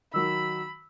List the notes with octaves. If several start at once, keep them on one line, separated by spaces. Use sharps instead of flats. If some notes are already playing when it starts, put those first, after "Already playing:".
D#3 F#3 B5 E6